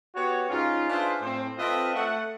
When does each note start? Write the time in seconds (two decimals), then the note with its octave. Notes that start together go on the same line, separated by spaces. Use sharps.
0.16 B3 F#4 G4 C#5
0.50 G#2 C#4 D#4 F4
0.90 D4 F4 G#4 B4 C5 E5
1.22 A2 C4 C5
1.59 C4 F4 A4 B4 D#5 E5
1.96 A3 F#5